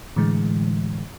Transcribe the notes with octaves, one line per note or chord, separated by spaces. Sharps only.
A2 D3 E3 G#3